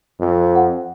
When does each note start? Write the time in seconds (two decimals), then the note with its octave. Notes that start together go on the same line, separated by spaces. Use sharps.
0.20 F2
0.55 F#5